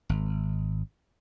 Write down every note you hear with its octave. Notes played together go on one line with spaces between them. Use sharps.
G#1